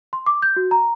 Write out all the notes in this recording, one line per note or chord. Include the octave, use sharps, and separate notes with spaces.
C6
D6
G6
F#4
A#5